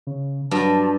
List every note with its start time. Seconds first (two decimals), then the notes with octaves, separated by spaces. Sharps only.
0.07 C#3
0.51 G2 F#3 A5